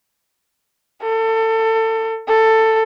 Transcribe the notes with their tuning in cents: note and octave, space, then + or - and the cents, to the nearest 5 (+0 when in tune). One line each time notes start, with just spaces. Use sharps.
A4 +25
A4 +15